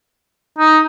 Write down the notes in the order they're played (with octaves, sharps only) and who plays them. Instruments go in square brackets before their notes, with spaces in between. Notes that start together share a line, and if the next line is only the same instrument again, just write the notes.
[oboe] D#4